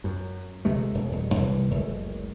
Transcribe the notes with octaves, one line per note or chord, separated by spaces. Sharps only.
F#2
C#2 C3 G#3 A3
E1
D#1
C2 E3
F#1 C#2 A3